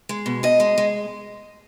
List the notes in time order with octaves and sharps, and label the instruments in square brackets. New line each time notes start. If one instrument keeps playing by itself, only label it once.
[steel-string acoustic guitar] G#3
B2
B2 D#5
G#3
G#3